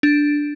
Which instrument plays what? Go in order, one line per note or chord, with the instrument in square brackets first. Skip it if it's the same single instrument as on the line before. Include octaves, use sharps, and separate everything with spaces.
[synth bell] D4